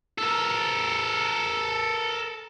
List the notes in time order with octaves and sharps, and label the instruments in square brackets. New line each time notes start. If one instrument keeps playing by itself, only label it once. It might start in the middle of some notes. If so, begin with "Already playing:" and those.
[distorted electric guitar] A4 A#4